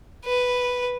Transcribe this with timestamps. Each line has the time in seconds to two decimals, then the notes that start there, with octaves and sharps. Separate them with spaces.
0.25 B4